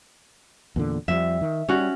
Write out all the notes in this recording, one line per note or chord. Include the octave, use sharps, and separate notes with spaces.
E2 A#2 D3
F2 F3 G3 E5
D#3
G3 C#4 F#4